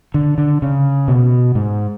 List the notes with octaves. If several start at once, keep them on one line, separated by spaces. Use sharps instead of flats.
D3
D3
C#3
B2
G#2